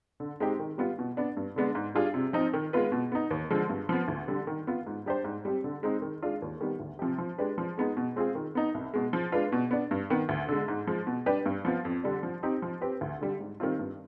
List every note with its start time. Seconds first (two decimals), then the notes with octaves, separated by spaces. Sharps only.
0.20 D3
0.40 G#3 C4 D#4 G4
0.60 D#3
0.78 G3 B3 F4
0.99 B2
1.17 B3 D4
1.37 G2
1.56 D3 G#3 B3 D4
1.75 G#2
1.95 G3 D4 F4 G#4
2.14 C3
2.33 F3 C4 D#4
2.54 D#3
2.73 G#3 B3 F4 B4
2.92 B2
3.12 B3 D#4
3.31 D#2
3.50 D3 F3 G#3
3.69 G2
3.89 F3 B3
4.08 D2
4.28 D3 G3
4.47 D#3
4.67 B3 F4
4.87 G#2
5.06 G3 D4 G4 C5
5.24 G#2
5.45 G3 C4 G4
5.64 D3
5.83 G#3 C4 D#4
6.02 D#3
6.23 G#3 D4 F4
6.42 D#2
6.61 D#3 G3 B3
6.80 D2
6.99 C3 F3 C4 G4
7.18 F3
7.38 G#3 D4 G4 B4
7.58 F3
7.78 G#3 B3 D#4 G#4
7.97 B2
8.16 G#3 C4 F4 G#4
8.35 D#3
8.55 B3 D#4
8.74 C2
8.94 B2 G#3
9.13 F3
9.32 G#3 D4 F4 B4
9.52 B2
9.71 B3 D4
9.91 G2
10.10 D#3 B3
10.29 D2
10.49 D3 G#3
10.68 G#2
10.87 F3 G#3
11.07 B2
11.26 G3 D4 G4 B4
11.46 G2
11.65 F3 B3 F4
11.85 F2
12.04 D3 G3 D4
12.23 F3
12.43 C4 D#4 G4
12.62 F3
12.81 C4 G4 B4
13.01 D2
13.21 D3 G3
13.40 G#2
13.60 D#3 G3 C4 F4
13.79 G2